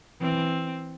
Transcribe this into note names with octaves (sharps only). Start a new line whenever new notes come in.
E3 C4